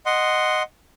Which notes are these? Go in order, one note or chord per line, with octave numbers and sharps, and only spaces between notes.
D#5 F#5 C6